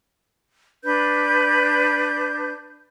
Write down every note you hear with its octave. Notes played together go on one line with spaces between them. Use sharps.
D4 B4 G6